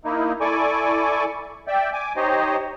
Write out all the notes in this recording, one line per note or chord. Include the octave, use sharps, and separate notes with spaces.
A#3 D#4 E4
E4 A4 D5 G#5 C#6 D6
D5 E5 G5
G#5 D6
D#4 G4 C5 C#5 D#5